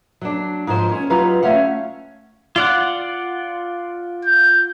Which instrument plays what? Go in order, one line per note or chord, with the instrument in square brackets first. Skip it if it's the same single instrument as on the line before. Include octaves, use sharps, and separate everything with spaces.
[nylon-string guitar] F#3 D4
G#2 F3 C5
C#4 C#5
F#3 D#4 F4 G4 B4
A3 C#4 C#5 F5 F#5
[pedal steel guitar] F4 D5 F#5
[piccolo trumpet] G6